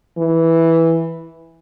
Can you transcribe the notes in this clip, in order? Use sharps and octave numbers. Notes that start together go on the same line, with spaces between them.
E3